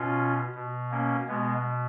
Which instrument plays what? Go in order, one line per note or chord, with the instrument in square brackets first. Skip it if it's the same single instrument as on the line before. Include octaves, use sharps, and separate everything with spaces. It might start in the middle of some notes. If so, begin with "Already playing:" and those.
Already playing: [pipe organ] B2 C#4 F4
B2
A#3 C#4
B2 G#3 B3